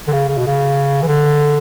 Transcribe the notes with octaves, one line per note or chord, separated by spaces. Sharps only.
D3
C#3
C#3
B2
C#3
E3
D3